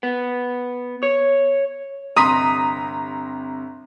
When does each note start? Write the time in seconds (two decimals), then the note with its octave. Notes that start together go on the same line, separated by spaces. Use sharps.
0.03 B3
1.03 C#5
2.16 G1 C3 A#5 C6 D#6 B6